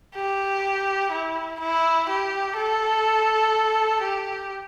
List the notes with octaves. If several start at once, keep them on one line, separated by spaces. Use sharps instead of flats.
G4
E4
E4
G4
A4
G4